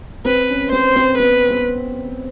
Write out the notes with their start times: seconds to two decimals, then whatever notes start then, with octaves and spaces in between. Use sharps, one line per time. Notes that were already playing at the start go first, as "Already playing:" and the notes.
0.25 C4 B4
0.49 C#4
0.72 C4 C5
0.96 C4
1.18 B3 B4
1.50 B3